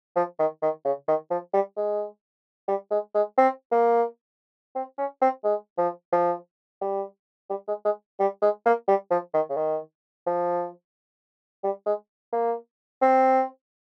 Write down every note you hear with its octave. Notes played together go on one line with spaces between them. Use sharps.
F3
D#3
D#3
C#3
D#3
F3
G3
G#3
G3
G#3
G#3
C4
A#3
C4
C#4
C4
G#3
F3
F3
G3
G3
G#3
G#3
G3
G#3
A#3
G3
F3
D#3
C#3
D#3
F3
G3
G#3
A#3
C4